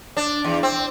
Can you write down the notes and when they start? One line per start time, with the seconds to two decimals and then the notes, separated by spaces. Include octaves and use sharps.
0.17 D4
0.44 E2
0.63 C4